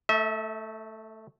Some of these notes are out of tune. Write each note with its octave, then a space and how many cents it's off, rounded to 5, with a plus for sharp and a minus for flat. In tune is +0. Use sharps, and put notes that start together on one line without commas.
A3 +5 E5 -35